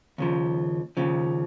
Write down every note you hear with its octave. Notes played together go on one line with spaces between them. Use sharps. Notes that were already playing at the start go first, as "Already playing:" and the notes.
D#2 C#3 F3
D#2 C#3 F3